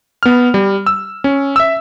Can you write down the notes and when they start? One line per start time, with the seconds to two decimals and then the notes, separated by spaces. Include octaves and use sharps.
0.23 B3 F6
0.54 G3
0.86 E6
1.24 C#4
1.56 E5 E6